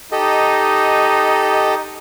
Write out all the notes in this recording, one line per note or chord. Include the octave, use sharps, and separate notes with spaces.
D#4 G4 A4 D#5